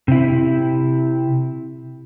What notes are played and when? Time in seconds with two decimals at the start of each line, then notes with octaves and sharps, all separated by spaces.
0.08 C3 E4